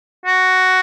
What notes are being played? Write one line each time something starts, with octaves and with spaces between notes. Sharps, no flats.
F#4